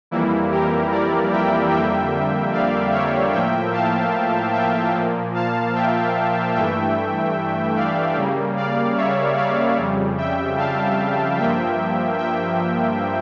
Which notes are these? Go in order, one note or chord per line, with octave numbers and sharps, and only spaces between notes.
F2 E3 G3 A#3 E4
G4 A#4
A#4 D5
E5 G5
F2 D3 G3 A#3 E5 G5
D5 F5
C#5 E5
A2 F3 A#3 E5 G5
F5 A5
E5 G5
A#2 F3 A#3
F5 A5
E5 G5
G2 E3 A3 E5 G5
D5 F5
C#3 G3 A#3
D5 F5
C#5 E5
D5 F5
F2 C#3 G3
E5 G5
F5 A5
G2 F3 A#3 E5 G5
E5 G5